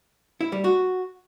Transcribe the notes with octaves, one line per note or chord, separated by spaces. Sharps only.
E4
G3
F#4